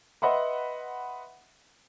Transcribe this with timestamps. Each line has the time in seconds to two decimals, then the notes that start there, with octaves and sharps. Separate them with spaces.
0.22 B4 D#5 E5 F#5 B5 C6